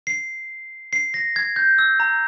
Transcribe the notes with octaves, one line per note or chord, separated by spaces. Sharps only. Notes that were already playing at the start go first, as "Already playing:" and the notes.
C7
C7
A#6
G#6
G6
E6
A#5